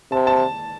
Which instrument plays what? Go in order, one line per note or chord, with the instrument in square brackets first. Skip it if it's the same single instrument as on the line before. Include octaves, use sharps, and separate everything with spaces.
[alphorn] C3 [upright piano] A5
[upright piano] A5